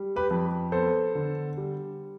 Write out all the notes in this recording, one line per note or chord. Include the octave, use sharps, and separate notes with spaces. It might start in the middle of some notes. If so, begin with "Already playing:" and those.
Already playing: G3
G4 B4
F2
B3 A4 C5
D3
G3